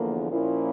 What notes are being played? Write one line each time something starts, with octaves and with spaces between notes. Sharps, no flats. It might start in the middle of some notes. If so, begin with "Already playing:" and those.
Already playing: E2 D3 F3 A#3
A#2 F3 A#3 C#4 E4